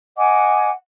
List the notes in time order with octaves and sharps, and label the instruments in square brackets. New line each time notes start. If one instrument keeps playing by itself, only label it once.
[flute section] D#5 F#5 G#5 D6